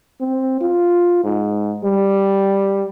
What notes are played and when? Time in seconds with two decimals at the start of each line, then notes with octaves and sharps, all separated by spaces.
0.21 C4
0.61 F4
1.24 G#2
1.84 G3